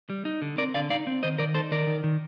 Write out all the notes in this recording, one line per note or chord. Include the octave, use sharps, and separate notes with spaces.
G3
D#4
D3
C4 A#4 D5
D3 D5 F5
D#4 D5 F5
C4
D#3 C5 D#5
D#3 A#4 D5
D#4 A4 C5
D#3 A#4 D5
D#3
D#3